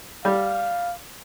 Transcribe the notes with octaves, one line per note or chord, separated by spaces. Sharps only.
G3 F5